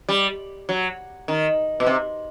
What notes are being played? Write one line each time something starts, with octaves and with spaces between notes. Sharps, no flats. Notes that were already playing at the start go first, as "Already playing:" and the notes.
G3
F#3
D#3
B2
C3